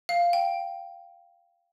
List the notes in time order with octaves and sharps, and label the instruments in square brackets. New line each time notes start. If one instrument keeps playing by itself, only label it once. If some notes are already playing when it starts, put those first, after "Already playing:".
[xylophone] F5
G5